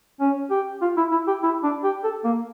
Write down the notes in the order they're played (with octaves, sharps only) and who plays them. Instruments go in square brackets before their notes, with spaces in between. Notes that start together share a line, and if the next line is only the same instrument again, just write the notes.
[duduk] C#4
G4
F4
E4
E4
G4
E4
D4
G4
A4
A#3